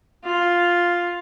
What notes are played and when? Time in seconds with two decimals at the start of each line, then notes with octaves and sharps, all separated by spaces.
0.24 F4